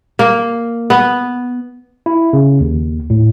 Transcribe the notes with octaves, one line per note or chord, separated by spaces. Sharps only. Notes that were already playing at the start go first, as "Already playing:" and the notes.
A#3
B3
E4
C#3
D#2
A2